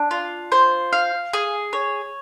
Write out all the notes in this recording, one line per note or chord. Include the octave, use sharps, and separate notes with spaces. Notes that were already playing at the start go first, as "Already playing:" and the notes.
Already playing: D4
F4
C5
F5
G#4
C#5